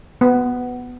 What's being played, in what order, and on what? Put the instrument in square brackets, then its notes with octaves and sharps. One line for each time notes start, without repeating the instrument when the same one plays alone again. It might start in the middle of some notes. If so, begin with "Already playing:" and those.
[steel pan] B3